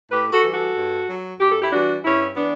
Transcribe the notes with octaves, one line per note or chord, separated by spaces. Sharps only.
A2 G4 B4
F#4 A4
E3 G3
F#4 A4
G2
F#3
F#2 G4
A4
E4 G4
E3 G3 D4 F#4
G2 C#4 E4
E3 B3 D4